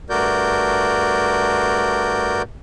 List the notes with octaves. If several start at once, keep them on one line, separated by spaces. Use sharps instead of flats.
G2 A3 F#4 A#4 D5 G6